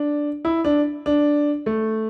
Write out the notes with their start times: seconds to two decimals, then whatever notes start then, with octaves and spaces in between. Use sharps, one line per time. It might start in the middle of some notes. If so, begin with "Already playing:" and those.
Already playing: D4
0.45 E4
0.65 D4
1.06 D4
1.66 A3